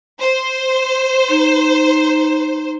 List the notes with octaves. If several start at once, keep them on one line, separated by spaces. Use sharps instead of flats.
C5
D#4